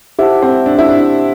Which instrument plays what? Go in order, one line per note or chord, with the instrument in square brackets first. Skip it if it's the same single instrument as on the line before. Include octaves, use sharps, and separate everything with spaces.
[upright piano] E4 [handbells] G4 C5 F#5 A5
[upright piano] C4
D4
E4
D4